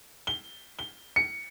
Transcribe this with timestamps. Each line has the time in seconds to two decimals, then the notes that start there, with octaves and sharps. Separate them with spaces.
0.27 G7
0.79 G7
1.16 C#7